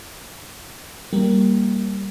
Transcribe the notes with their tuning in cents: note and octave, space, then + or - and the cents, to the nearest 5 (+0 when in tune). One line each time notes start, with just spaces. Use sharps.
G3 +0 A#3 +0